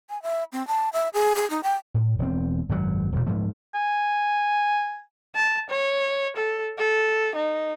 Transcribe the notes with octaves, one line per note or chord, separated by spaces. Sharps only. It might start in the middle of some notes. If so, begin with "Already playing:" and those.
G#5
E5
C4
A5
E5
G#4
G#4
D#4
G5
A2
E1 C4
G#1 F#2 A#2 F#3
E1 D2 G2 A#2
G#2 F3 A3
G#5
A5
C#5
A4
A4
D#4